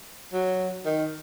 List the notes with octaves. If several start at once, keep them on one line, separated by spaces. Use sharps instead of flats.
F#3
D#3